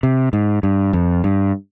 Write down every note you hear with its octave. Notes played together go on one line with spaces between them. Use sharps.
C3
G#2
G2
F2
G2